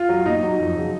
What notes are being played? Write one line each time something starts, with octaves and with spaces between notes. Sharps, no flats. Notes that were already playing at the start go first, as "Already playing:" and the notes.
Already playing: F4
F#3
A#2 D#4
F#3
F2
C#3 F#3